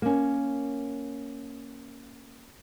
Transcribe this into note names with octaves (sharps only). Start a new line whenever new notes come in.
A#3 C#4